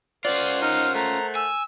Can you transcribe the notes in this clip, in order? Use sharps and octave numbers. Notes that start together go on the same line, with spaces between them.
C#4 F4 A#4 C5 D5 F#5
D#4 F6
A3 A#5
G#5 E6